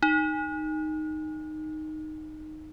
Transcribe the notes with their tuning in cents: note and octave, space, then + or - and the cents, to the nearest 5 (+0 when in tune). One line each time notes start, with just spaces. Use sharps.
D#4 -5